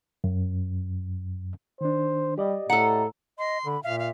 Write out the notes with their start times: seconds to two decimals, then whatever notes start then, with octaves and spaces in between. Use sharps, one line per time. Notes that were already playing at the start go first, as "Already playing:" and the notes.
0.24 F#2
1.81 D#3 D4 C5
2.38 G3 G4 D5 D#5
2.70 A2 A4 F#5 A#5
3.39 D#5 C6
3.66 D3 B5
3.83 A#2 E5 F5
3.99 F5